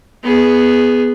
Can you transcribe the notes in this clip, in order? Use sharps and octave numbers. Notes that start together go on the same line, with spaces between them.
B3 G#4